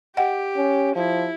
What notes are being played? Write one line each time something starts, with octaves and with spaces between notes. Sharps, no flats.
G4 D#5 F#5 G5
C#4
F3 E4